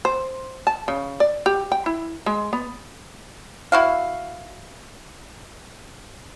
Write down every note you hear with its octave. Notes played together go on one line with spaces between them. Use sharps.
C5
A5
C#3
D5
G4
G5
E4
G#3
B3
E4 F#4 F5